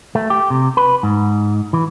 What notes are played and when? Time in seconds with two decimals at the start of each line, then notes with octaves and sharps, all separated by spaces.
0.15 A3
0.30 G4
0.50 C3
0.77 B4
1.03 G#2
1.73 E3